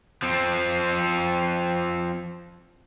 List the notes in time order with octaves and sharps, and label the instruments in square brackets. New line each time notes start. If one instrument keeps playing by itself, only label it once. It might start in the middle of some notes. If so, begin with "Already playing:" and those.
[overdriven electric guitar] F3 C4